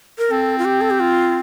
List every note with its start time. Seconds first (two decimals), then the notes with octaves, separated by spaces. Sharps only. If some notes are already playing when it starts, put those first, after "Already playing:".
0.18 A#4
0.31 C4 A4
0.58 F4
0.65 G4
0.81 A4
0.90 G4
1.00 F4